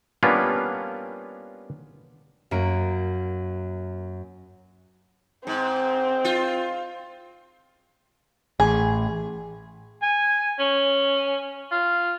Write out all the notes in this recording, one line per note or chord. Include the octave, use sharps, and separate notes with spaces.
G3 A#3 B3 C#4 D4 F4
F#2 A#3 D7
G#2 C4
F4
A1 G#4
G#5
C#4
F4